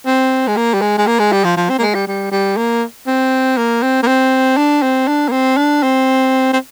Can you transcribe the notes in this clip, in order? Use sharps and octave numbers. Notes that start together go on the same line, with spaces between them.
C4
G#3
A#3
G3
G#3
G#3
A#3
G#3
G3
F3
F3
C4
A#3
G#3
G3
G3
G3
A#3
C4
A#3
C4
A#3
C4
D4
C4
D4
A#3
C4
D4
C4
C4